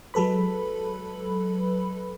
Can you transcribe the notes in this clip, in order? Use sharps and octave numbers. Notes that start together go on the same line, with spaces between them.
F#3 G#3 A4 B4 B5